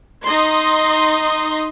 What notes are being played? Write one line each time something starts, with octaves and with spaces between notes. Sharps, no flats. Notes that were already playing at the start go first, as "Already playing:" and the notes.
D#4 D#5 C6